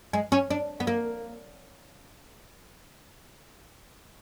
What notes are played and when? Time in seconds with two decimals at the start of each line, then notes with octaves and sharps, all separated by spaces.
0.13 G#3
0.32 C#4
0.51 D4
0.80 B3
0.87 A#3